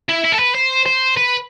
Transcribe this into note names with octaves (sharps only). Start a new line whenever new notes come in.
E4
E4
A4
B4
C5
C5
B4